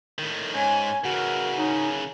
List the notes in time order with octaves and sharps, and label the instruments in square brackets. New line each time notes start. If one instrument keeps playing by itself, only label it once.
[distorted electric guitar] A2 D#3
[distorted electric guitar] G#2 [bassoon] C#4 [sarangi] G#5
[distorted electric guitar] C#3 E3 [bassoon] F#4 [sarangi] A#4
[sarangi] C#4 [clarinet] D#4